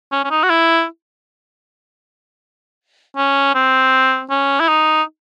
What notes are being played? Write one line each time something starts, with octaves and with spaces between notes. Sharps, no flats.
C#4
C#4
D#4
F#4
E4
C#4
C4
C#4
E4
D#4